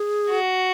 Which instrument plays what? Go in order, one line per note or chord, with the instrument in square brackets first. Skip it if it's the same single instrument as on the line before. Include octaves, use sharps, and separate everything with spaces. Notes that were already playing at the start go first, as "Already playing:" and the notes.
Already playing: [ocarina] G#4
[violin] F#4